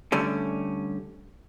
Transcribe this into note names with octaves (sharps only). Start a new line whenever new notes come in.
D3 G3 A3 C#4